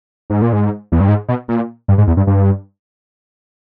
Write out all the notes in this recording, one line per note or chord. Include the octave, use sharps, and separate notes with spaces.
G#2
A#2
G#2
E2
G2
G#2
B2
A#2
G2
G#2
E2
G2
G2